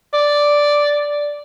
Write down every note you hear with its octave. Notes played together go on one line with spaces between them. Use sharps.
D5